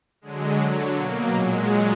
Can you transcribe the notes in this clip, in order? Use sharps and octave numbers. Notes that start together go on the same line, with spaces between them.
D3 F#3 G#3
D3 F#3
B2 F#3 A#3
A#2 F#3 G#3